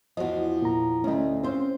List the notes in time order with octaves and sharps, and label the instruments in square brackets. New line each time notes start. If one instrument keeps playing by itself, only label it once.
[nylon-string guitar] E2 F3 [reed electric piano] F#4 D#5
[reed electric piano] A#2 A#5
[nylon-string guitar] D2 A3 [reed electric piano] C#4 D#5
[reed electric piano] C4 C#4 [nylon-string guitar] F4 C5